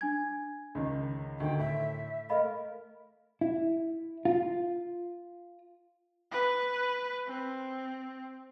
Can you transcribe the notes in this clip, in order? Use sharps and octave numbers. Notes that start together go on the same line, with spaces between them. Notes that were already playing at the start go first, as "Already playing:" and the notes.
D4 G#5 G#6
C#2 D#3
D2 D#3 G5
A2 E5
A3 A#4 D#5 F5 B5
E4
F4
B4
C4